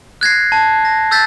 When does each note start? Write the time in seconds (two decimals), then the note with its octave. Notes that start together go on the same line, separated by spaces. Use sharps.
0.21 F#6 G#6 A#6 C7
0.52 A5
0.85 A#6
1.11 E6 G6 A6 B6